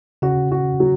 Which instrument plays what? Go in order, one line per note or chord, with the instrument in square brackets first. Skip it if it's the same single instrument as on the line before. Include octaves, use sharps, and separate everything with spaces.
[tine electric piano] C#3 C#4 [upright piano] F#4
[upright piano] F#4
F#3